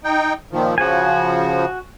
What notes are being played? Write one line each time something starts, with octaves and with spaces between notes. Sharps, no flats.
D#4 G5
A#2 D#3 F3
C#3 F3 F#4 G#5